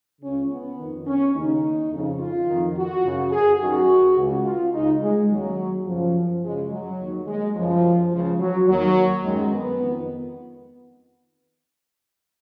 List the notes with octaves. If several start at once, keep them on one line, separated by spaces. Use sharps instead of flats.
C#2 C#3 C#4
B3
F2 D#3
C#4
D#2 C#3 D#4
F2 C#3
F4
F2 D#3
F#4
F#2 C#3
G#4
F#2 D#3 F#4
C#2 C#3
F4
C#2 C#3 D#4
G#3
D#2 C#3 F#3
F#2 C#3 F3
F#2 C#3 G#3
F#3
D#2 D#3
G#3
F#2 C#3 F3
C#2 C#3 F3
F#3
D#2 D#3 F#3
F#2 D#3 G#3
B3
F2 D#3